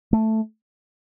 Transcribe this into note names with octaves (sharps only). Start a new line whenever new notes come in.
A3